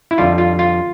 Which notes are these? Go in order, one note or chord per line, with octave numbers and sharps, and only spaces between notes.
E4
F2 D3 G3 F4
F4
F4